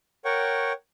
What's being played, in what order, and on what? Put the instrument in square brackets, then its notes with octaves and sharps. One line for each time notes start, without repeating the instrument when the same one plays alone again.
[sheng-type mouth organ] A#4 C#5 F#5 G5 C#6